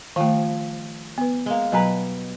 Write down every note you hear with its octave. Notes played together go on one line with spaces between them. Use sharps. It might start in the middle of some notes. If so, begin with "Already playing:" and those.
D#3 F3 G3 A3
B3 B4
G#3 A#3
B2 F#3 G3 B4 G#5 A#5